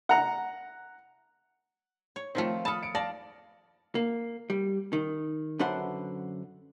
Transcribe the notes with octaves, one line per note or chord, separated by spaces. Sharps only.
F#5 A#5
C#5
D#3 F3 A3 C4 F4
A4 A5 B5 D#6 F6
C#7 D7
D5 F5 A5 A#6
A#3
G3
D#3
F#2 D3 D4 B4 C5 F#5